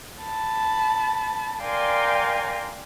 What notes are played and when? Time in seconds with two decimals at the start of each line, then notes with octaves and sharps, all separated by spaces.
0.23 A5 B5
1.62 A#4 D5 F5 G5 G#5 C6